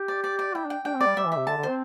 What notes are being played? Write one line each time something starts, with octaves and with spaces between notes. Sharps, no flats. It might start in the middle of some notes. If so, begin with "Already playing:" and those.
Already playing: G4
D5
D5
D5
E4 G5
D4
G5
D4 G5
C4
D5
G3
G3 E5
E3
E5
C3
D3 A5
D3
C4 C5